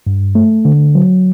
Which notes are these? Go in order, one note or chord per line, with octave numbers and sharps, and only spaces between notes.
G2
A3
D3
F#3